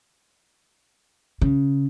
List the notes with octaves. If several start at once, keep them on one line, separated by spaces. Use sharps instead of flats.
C#3